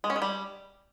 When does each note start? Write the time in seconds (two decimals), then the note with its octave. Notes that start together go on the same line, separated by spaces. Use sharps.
0.04 G#3
0.10 C#4
0.16 G#3
0.22 G3